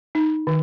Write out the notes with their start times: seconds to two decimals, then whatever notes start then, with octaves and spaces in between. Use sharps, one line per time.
0.15 D#4
0.47 D#3